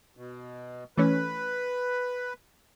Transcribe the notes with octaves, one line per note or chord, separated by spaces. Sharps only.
B2
E3 A3 C#4 B4